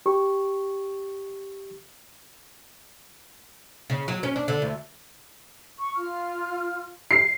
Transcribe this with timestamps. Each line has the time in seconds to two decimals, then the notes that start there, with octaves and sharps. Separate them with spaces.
0.06 G4 C#6
3.90 C#3
4.08 F#3
4.23 C#4
4.36 D4
4.48 D3
4.62 D2
5.79 C#6
5.95 F4 F6
7.11 C7